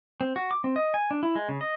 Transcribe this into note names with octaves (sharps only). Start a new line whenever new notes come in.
C4
F#4
D6
C4
D#5
G#5
D4
E4
G#3
C#3
D#5